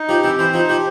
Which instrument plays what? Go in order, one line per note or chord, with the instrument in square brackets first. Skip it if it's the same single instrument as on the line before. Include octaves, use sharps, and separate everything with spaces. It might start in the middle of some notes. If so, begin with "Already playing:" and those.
Already playing: [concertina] D#4
[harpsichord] F3 [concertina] G4
[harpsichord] E3 [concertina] C4
[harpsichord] E3 [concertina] C5
[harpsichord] F3 [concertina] D#4
[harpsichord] F3 [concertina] G4